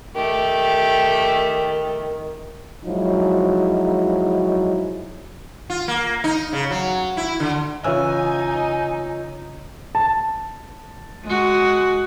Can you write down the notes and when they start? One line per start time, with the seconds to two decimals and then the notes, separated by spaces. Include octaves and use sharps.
0.15 D#3 A3 G4
2.85 F3 F#3 G#3 D#4 E4
5.70 F4
5.88 A#3
6.24 D#4
6.53 C#3
6.71 F#3
7.17 E4
7.40 D3
7.84 C#3 E3 D#4 F4 C#5 G#5 E6
9.95 A5
11.25 G#3 F#4